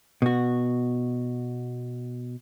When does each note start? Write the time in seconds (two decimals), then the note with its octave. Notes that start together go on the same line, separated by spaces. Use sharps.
0.22 B2 F#4